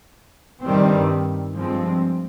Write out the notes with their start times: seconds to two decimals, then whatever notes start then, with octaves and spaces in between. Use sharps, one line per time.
0.63 G2 D#3 G3 C4
1.54 G2 F3 G#3 C4